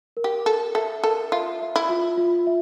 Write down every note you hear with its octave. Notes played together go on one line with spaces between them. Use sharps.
A#4
G4
A4 A#4
A4 E5
A4 A#4
F4 E5
E5
E4
F4
F4
E5